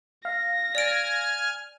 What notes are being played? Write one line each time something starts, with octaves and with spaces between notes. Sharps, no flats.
F5 A#6
D5 G#5 F6 D7